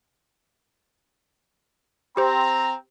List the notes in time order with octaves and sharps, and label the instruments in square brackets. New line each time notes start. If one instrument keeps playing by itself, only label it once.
[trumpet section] C4 [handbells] G4 C5 [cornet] A#5